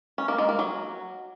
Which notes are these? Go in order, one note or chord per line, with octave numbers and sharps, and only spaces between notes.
C#4
A#3
G#3
A#3
F#3